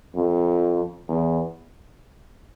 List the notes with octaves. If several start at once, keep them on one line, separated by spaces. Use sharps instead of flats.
F2
E2